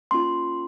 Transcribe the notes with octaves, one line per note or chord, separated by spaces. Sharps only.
A#3 C#4 F4 C6